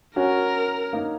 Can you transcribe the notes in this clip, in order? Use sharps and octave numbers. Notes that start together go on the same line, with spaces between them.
C#4 F#4 A#4
A#3 D#4